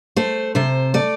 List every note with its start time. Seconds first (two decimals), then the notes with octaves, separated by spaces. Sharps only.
0.16 A3 C5
0.55 C3 C5
0.94 A3 D5